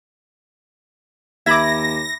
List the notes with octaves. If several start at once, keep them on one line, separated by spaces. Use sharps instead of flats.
D#2 E5 B5 D6 G#6 A#6